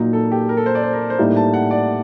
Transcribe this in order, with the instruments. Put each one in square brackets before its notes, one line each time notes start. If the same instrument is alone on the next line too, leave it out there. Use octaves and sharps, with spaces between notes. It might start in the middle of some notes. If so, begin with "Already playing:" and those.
Already playing: [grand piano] A#2 F#3 A#3 [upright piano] D#4
[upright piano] A4
G4
A#4
A4
C5
D5
C5
A#4
C5
[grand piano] A2 G3 A#3 D#4
[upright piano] A5
F#5
D5